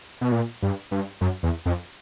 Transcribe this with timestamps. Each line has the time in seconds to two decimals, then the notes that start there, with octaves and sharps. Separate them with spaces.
0.21 B2
0.32 A#2
0.62 G2
0.91 G2
1.21 F#2
1.43 E2
1.66 F2